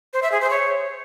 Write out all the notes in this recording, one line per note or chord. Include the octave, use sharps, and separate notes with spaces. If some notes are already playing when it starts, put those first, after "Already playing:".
C5
E5
G#4
C5
C#5